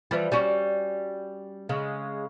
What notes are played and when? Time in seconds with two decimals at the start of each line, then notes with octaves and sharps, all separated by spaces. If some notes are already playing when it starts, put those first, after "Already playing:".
0.11 E3 F3 G3
0.32 G3 C#4 F#4
1.69 C#3 G#3